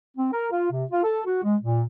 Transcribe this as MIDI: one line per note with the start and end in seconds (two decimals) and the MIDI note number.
0.17 0.31 60
0.33 0.47 70
0.52 0.70 65
0.72 0.85 48
0.91 1.02 65
1.04 1.21 69
1.25 1.44 66
1.44 1.56 56
1.62 1.83 46